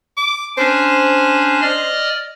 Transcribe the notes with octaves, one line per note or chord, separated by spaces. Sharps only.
D6
C#4 D4 C5
D5 D#5 F6